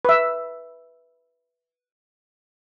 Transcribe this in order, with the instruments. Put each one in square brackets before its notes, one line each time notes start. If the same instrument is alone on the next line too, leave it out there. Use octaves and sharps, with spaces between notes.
[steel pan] B4 E5